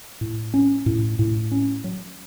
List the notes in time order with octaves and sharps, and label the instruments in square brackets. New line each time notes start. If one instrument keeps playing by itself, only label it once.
[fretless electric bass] A2
C#4
A2
A2
C#4
F#3